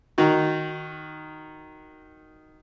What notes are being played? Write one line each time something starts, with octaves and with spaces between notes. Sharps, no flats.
D#3 D#4 F#4